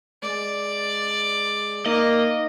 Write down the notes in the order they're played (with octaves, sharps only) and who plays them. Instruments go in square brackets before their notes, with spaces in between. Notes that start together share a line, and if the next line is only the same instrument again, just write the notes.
[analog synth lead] G#3 [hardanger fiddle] D5
[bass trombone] A#3 [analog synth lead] D#4 [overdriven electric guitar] D#5